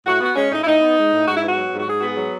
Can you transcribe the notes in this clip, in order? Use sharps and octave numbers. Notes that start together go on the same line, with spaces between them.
A2 F#4
B3 F#4
G#3 C#4
A2 D#4
E4
A2 D#4
B3
G#3
A2
G#2 F#4
E4
B3 F#4
F#3
G#2
F#4
G#2 G#4
B3 F#4
G#4
F#3